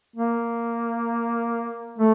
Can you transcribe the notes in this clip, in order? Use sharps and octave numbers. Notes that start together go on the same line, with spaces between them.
A#3
A3